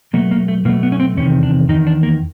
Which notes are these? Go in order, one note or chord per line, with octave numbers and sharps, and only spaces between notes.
B2 F#3 A3 A#3
A#3
A3
B2 F#3 A3 A#3
B3
C#4
C4
E2 C3 D#3 C#4
D4
E2 C3 D#3 D#4
D4
A#3